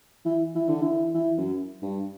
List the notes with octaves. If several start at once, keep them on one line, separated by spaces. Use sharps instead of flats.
E3
E3
D3
E3
E3
F#2
G2